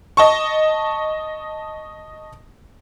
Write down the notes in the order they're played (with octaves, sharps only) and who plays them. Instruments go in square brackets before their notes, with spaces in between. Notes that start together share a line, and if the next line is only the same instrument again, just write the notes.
[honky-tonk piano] D#5 A5 C#6